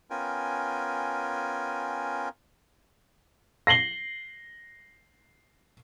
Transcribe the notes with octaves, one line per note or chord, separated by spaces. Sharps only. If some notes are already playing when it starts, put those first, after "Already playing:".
B3 C#4 F4 A#4 G5 G#5
A#6 C7 F#7 G7